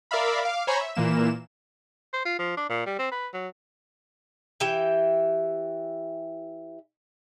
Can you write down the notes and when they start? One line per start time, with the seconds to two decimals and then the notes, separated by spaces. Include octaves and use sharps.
0.11 A#4 D5 E5 F5 B5
0.43 F5 D6
0.67 C5 C#5 G#5 A#5 B5 C#6
0.81 E5
0.95 A#2 E3 A#3 E7
2.13 C5
2.25 F4
2.39 F3
2.57 D4
2.69 A#2
2.86 G3
2.99 C4
3.11 B4
3.33 F#3
4.60 E3 G4 E5 G5